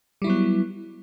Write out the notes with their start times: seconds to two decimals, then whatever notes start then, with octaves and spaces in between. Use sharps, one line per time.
0.22 G3
0.24 E4
0.27 F#3
0.30 B3